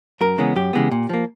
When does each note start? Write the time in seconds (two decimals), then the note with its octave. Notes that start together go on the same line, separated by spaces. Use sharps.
0.21 F#2 A#4
0.38 C#3 E3 G#3 B3
0.56 F#2 G4
0.73 C#3 E3 G#3 B3
0.91 A#2
1.09 F3 A#3